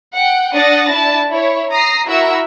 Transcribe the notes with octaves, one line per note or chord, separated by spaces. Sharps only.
F#5 G5
D4 F#5 D#6 A6 A#6
D4 E4 A5
E4 C#5
A#5 D#6 A#6 C7
E4 F#4 A#4 E5 E6